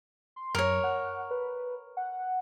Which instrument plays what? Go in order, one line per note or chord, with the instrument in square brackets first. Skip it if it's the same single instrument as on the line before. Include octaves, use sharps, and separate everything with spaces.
[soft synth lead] C6
[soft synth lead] F#2 [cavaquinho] A#4 C#5
[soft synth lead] F#5
B4
F#5